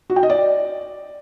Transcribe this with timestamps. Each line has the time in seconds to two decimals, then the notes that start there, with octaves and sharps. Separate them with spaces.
0.10 F#4
0.16 G5
0.23 D#5
0.30 D5